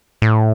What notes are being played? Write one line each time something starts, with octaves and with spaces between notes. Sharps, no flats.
A2